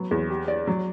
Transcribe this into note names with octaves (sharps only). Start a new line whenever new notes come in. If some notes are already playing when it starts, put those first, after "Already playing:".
Already playing: F#3 B3
E2
G4
D5
F#3